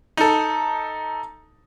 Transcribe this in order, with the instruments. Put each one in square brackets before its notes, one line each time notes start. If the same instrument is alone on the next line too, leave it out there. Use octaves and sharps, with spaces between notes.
[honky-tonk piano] D#4 A4